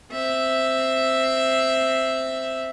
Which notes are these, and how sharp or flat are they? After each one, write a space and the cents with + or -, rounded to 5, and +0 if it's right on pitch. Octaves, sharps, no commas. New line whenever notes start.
C4 +0 E5 +0